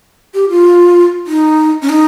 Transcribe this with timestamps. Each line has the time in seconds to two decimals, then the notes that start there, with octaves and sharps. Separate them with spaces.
0.34 G4
0.50 F4
1.27 D#4
1.82 C#4
1.89 D#4